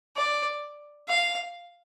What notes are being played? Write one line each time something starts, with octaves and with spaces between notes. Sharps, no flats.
D5
F5